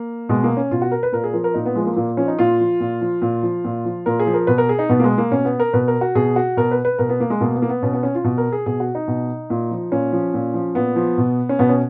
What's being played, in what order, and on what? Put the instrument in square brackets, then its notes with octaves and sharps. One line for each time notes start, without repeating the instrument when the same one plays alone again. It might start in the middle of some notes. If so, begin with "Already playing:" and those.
Already playing: [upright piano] A#3
B2 G#3
A#3
C#4
B2 F4
F#4
A#4
B4
A#2 A#4
G#4
F3 A#4
A#4
A#2 D#4
B3
F3 G#3
A#3
A#2 A#3
F3 C#4
D#4
A#2 F4
F3
A#2
F3
A#2
F3
A#2
F3
A#2 A#4
G#4
F3
A#4
B2 B4
A#4
G#4
D#4
B2 B3
A#3
G#3
A#3
B2 C#4
B3
A#4
B2 B4
A#4
F#4
B2 G#4
F#4
B2 A#4
B4
B4
B2 A#4
B3
A#3
G#3
B2 A#3
B3
A#3
B3
B2 C#4
B3
C#4
F4
B2
A#4
G#4
B2 G#4
F#4
D#4
B2
A#2
F3
A#2 C#4
F3
A#2
F3
A#2 B3
F3
B2
C#4
B2 B3
C#4